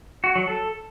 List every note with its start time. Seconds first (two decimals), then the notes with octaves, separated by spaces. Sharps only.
0.24 F#4
0.36 F#3
0.47 A4